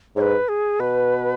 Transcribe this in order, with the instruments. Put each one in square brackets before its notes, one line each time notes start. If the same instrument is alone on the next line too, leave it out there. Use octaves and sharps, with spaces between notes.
[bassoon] G#2 [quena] C#5
[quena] B4
G#4
[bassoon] B2 [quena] B4